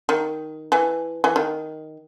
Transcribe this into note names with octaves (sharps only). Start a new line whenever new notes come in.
D#3
E3
E3
D#3